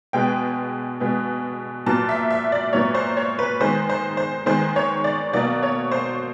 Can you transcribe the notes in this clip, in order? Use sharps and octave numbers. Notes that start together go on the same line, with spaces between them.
B2 G#3 B3 G5
B2 G#3 B3
A#2 F#3 B3 A5
E5
E5
D5
A#2 F#3 B3 C#5
C5
C#5
B4
D#3 G#3 B3 C5
C5
C5
D#3 G#3 B3 C5
C#5
D5
B2 F#3 A#3 D5
C#5
C5